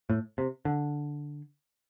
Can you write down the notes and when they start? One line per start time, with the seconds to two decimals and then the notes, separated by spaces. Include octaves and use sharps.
0.10 A2
0.38 C3
0.65 D3